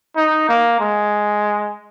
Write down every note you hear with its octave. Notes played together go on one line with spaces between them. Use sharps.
D#4
A#3
G#3